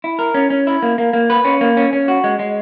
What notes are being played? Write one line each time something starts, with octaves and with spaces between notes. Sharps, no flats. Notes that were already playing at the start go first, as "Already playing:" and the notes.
E4
A#4
C#4
C#4
E4
A#3
A#3
A#3
B4
C#4
A#3
C#4
C#4
F#4
G#3
G#3